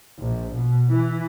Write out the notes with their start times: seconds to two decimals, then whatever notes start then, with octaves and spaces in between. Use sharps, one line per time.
0.19 A#1
0.54 B2
0.93 E3